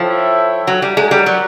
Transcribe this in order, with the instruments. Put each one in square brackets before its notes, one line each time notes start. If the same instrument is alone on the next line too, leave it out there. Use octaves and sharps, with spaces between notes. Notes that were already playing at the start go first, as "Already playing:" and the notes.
Already playing: [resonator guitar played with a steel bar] F3 [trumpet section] E4 A4 C#5 E5 G5
[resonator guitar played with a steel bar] F#3
G3
[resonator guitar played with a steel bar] G#3 [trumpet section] F#4 A#4 C#5 F#5
[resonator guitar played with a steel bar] G3
F#3